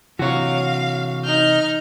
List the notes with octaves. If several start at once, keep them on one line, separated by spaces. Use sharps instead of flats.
C3 E3 F#4 C#5 F5
D#4 F6 G6